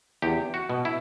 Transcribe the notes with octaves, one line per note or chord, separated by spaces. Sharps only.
E2 G4
F#4
B2
E4